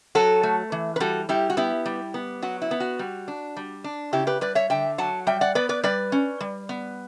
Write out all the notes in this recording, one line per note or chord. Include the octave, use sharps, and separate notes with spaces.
F#3 F#4 A4
A3
E3
B4
G3 F#4 A4
G3 E4 G4
F#4
B3 E4 G4
G3
B3
F#3 F#4
E4
B3
F#4
G3
D4
G3
D4
C#3 E4 G4
G4 B4
G3 B4 D5
C#5 E5
D3 E5 G5
F#3 F#5 A5
G3 E5 G5
D5 F#5
B3 B4 D5
B4 D5
G3 B4 D5
C#4
G3
B3